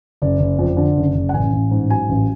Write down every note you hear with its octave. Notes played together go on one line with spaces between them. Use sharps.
F#1 D5
F#1
F2
D3
F#1
F#1
F#5
A1 G#5
A1
G#2
F#3 G#5
A1